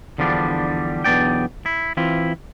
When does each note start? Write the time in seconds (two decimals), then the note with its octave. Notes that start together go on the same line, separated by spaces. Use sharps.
0.18 E2 D3 F3 G3 C#4 D4
1.04 B1 E2 B3 D4 D5 G5
1.66 E4
1.97 E3 C4 E4 F4